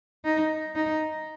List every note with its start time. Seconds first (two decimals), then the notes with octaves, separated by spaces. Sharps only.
0.25 D#4
0.76 D#4